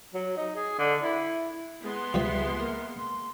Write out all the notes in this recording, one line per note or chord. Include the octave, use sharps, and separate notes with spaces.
F#3
D#4
G#4
D3
E4
G#3 B3 C6
C#2 F3 G3 B4 E5
A#3 A#4
C6